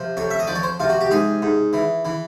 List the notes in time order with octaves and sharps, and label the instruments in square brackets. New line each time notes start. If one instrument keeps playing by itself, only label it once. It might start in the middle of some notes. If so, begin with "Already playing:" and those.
Already playing: [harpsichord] C3 F3
F2 C#5
E5
D#5
F3 D5
C#5
C5
C3 F4
F#4
G4
G#2 G#4
G#2
E3
E3